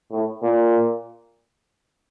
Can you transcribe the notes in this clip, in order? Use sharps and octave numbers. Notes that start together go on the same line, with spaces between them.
A2
A#2